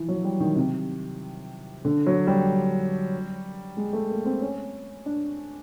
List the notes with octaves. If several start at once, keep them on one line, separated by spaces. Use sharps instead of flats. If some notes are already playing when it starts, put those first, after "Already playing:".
Already playing: E3 F3
F#3
G3
D#3
C3
D3
F#3
G3
G#3
A3
A#3
C4
C#4
D4